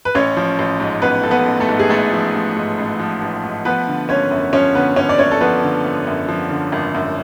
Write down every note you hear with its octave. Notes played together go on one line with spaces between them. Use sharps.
B4
A1 C#4 C#5
F3
A1
G#2
A1 B3 B4
F3 A4
B3 B4
A1
A3 A4
G#2
G#4
A1 A3 A4
F3
A1
G#2
A1
F3
A1
G#2
F3 B3 B4
D3
G#1 C#4 C#5
F#2
F3 C#4 C#5
D3 B3 B4
G#1 C#4 C#5
D5
F#2 C#4 C#5
A4
F3 B3 B4
D3
G#1
F#2
F3
D3
G#1
F#2